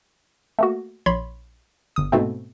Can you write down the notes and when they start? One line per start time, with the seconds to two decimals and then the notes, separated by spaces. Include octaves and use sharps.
0.59 A3 A#3 F#4
1.06 A#1 C#5 B5 C6
1.96 G1 D#6
2.12 G#2 B2 A3 C4